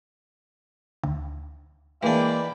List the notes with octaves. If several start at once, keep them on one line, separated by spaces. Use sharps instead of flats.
D2
E3 G#3 A#3 D4 G5 B5